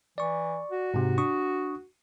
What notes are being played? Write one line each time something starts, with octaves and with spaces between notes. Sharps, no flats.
E3 D5 C#6
F#4
G#2 C3
D4 C#6 D#6